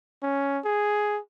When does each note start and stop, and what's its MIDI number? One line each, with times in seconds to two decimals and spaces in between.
0.23 0.60 61
0.65 1.20 68